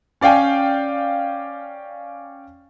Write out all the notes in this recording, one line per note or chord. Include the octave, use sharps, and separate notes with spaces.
C#4 D5 F5 G5 G#5